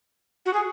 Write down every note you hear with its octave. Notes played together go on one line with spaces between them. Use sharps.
F#4
G#4